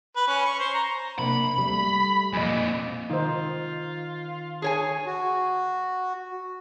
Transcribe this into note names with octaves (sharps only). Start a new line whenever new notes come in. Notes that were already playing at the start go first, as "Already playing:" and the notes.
B4
C#4
C#6
C5
A#5
C3 A#3 D4 B5
G3 A3
F2 A#2 D#5 G#5
D#3 D#4 F4 C5
G#4 C#5 G#5 A5
F#4